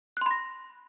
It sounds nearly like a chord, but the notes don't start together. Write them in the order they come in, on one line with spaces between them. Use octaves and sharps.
F#6 C6 B5 A#6